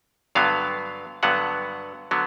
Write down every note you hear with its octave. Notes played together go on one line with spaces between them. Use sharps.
G2 D3 F#3 B3 F5
G2 D3 F#3 B3 F#5
D3 F#3 B3